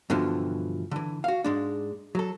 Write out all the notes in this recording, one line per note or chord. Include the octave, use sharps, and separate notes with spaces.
G2 B2 D3 E3 F3
D3 E3
F#4 F5
G#2 G#3 D4
F#3 A4